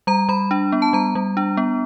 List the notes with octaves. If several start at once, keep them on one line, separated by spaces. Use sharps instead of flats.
G3 A#5
G3 B5
D4
B3
A5
G3 A#5
G3
D4
B3